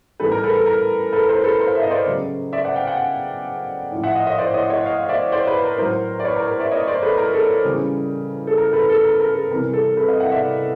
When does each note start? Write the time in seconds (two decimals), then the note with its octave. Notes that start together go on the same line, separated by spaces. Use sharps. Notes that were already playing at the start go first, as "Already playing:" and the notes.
0.20 A2 E3 G3 A4 B4
0.32 A#4
0.43 A4 B4
0.55 A4
0.66 A#4
1.13 A4 B4
1.29 A#4 C5
1.44 A4 B4
1.60 A#4 C5
1.67 F5
1.75 E5
1.83 D#5
1.90 C5 D5
2.06 C#3 F#3
2.53 D5 E5
2.64 E5 F#5
2.76 F5 G5
2.87 F#5 G#5
3.92 A2 F3
4.03 E5 F#5
4.15 D#5 F5
4.27 C#5 D#5
4.38 C5 D5
4.54 C#5 D#5
4.69 C#5 D#5
4.77 F#5
4.85 D#5 F5
5.03 F5
5.09 D5 E5
5.32 C5 D5
5.47 B4 C#5
5.63 A#4
5.78 A2 F#3 A#4 C5
6.20 D5
6.24 B4 C#5
6.36 A#4
6.48 A#4
6.60 D5 E5
6.71 C#5 D#5
6.87 C5 D5
7.02 A4 B4
7.18 A#4
7.34 A4
7.64 C#3 E3 G3
8.47 A4
8.58 A#4
8.73 A4 B4
8.89 A4
9.04 A#4
9.20 A#4
9.35 A4
9.51 C3 E3 G3 A#4
9.74 A4
9.97 A4 B4
10.08 D#5 F5
10.20 E5 F#5
10.32 D5 E5